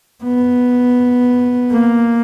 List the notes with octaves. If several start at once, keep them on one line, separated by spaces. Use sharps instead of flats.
B3
A#3